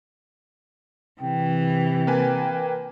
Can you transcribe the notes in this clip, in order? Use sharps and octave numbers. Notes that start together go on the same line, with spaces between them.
C3 E3 G5
A#3 B4 G#5